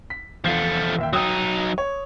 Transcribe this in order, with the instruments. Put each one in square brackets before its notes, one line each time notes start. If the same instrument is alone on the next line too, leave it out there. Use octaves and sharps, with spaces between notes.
[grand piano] B6
[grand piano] E2 F4 C7 [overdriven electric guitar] F3 A3
[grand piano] D#2 E5 G5
[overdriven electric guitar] F#3 D#4 [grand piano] G5 D#6 E6
[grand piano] C#5